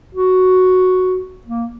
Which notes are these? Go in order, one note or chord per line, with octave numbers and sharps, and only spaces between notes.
F#4
A#3